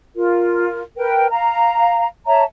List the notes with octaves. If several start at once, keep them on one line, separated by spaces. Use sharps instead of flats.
F4 A#4
A#4 B4 G5
F5 A#5
C#5 E5 A5 A#5